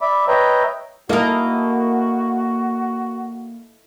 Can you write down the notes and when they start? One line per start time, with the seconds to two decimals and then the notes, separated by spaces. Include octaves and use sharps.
0.01 D5 E5 B5 D6
0.28 B4 C#5 D#5 E5 G5 A#5
1.09 A#3 E4 F#4 A4 A#4 D#5